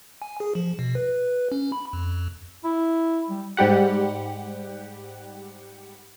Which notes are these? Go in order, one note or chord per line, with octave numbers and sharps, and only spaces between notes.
G#5
G#4
F3
B2
B4
C#4
B5
F2
E4
G3
G#2 G3 G4 F#5